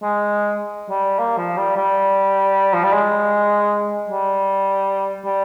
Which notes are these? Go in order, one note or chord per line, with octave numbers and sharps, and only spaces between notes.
G#3
G3
A#3
F3
G3
G3
F3
G3
G#3
G3
G3